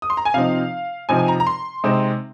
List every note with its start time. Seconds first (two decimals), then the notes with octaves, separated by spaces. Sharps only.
0.02 D#6
0.10 C6
0.17 A#5
0.25 G#5
0.34 C3 F3 C4 D#4 F5
1.09 C3 F3 C4 D#4 G#5
1.19 G#5
1.28 A#5
1.40 A#5
1.47 C6
1.84 C3 G#3 C4 D#4